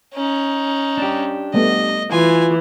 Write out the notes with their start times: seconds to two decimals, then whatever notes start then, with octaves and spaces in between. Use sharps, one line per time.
0.14 C#4 D#4
0.98 D4 G4
1.54 G3 A3 B3 D#5
2.12 E3 F4 G#5